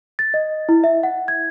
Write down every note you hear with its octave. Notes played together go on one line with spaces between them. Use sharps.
A6
D#5
E4
E5
F#5
G#6